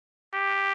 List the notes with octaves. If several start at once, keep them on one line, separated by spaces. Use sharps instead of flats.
G4